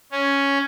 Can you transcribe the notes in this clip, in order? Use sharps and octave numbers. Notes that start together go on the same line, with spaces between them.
C#4